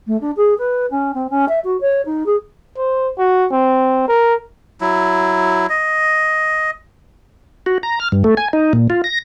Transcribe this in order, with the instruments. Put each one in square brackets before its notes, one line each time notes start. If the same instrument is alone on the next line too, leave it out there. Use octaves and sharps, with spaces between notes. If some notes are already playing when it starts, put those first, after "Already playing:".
[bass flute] A3
D4
G#4
B4
C#4
C4
C#4
E5
F#4
C#5
D#4
G#4
[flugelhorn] C5
F#4
C4
A#4
[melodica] F#3 E4
D#5
[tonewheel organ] F#4
A#5
F6
G2
A3
G#5
D#4
A#2
F4
A#6